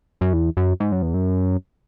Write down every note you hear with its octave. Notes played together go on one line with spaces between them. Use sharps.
F#2
E2
F#2
G#2
F#2
E2
F#2